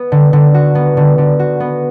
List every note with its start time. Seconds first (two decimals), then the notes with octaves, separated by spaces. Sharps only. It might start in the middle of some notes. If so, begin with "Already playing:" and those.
Already playing: B3
0.12 D3
0.33 D3
0.54 F#4
0.75 B3
0.97 D3
1.18 D3
1.39 F#4
1.60 B3